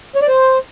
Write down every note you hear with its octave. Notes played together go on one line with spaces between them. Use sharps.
C#5
D5
C5